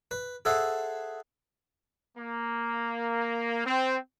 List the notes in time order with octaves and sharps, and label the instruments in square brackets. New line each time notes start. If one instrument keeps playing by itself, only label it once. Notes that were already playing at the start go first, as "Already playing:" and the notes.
[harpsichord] B4
G#4 A4 C5 E5 F#5
[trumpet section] A#3
C4